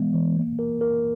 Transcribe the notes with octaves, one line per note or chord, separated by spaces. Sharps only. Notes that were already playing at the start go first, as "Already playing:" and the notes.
Already playing: E3 G#3 B3
E3
A#3
A#4
A#4